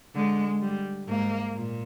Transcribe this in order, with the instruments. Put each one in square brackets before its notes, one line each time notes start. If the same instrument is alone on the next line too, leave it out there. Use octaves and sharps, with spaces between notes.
[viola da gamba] D3 [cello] G#3
[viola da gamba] G3
[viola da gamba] G#2 [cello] A#3
[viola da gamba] A#2